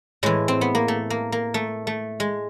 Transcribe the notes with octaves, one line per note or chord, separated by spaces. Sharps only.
A2 E3 G#3
C4
B3
A#3
A3
A#3
A#3
A3
A3
G#3